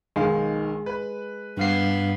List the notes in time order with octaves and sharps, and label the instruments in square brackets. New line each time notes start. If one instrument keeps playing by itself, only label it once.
[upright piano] B1 D#3 F5 [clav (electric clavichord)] G#3
[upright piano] B4 B5
[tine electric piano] G2 F5 C7 [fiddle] B3